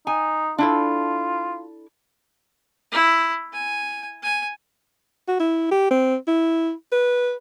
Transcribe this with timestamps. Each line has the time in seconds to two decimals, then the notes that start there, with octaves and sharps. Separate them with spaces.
0.07 D#4 G#5
0.58 D4 E4 F4 A4
2.92 E4
3.53 G#5
4.23 G#5
5.28 F#4
5.40 E4
5.71 G4
5.91 C4
6.28 E4
6.92 B4